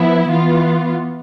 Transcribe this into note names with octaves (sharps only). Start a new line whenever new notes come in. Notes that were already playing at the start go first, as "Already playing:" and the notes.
Already playing: F3 B3 E4
E3 B3 F4